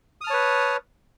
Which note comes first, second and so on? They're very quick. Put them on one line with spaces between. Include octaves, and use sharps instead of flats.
D#6 F6 A5 C#5 B4